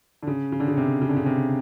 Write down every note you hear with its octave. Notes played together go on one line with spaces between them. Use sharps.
D3
C#3
C#3
D3
C#3
C3
C#3
D3
C#3
C3